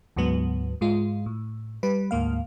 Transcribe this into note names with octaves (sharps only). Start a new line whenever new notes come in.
D2 G#2 F#3 B3
G#2 G#3 F4
A2
G3 B4
D2 G#2 A#3 F5